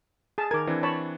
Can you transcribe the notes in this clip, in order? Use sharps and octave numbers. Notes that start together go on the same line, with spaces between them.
G#4 A5
D#3 A#4 D6 G#6
E3 C4 D4
C#5 A5 B5